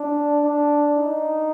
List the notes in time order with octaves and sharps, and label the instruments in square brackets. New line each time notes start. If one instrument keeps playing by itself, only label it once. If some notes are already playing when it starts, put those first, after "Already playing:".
Already playing: [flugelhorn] D4
D4
D#4